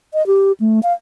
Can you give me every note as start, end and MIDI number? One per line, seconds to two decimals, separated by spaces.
0.14 0.25 75
0.27 0.52 67
0.60 0.80 57
0.83 0.93 77